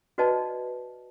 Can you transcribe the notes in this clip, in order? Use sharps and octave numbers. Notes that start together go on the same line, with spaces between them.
F#4 B4 D5 D#5 A5